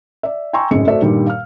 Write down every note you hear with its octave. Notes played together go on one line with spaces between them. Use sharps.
D5 E5
G5 G#5 A#5 C6 C#6 E6
G#1 F#2 A2 C#3 G#4 C#7
A3 F#4 A4 C5 D5 E5
G2 A#2 D#3 G3
F5 F6